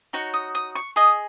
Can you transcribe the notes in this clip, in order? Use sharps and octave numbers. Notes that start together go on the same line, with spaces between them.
D#4 F#4 C#5
D#6
D#6
C#6
G#4 D#5 D#6